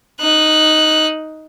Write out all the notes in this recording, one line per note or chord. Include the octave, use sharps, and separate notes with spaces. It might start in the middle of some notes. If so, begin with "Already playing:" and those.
D#4 F#6